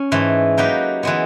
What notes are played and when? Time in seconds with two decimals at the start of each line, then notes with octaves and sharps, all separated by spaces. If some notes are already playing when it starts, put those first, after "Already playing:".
Already playing: C#4
0.12 G#2 E3 A3
0.58 F#3 A#3 D#4 G4 B4
1.03 E3 G#3 B3